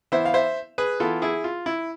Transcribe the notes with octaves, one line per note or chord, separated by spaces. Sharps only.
E3 B3 E4 C5 E5
F5
C5 E5
G#4 B4
E3 B3 E4 F4 A4
E4 G#4
F4
E4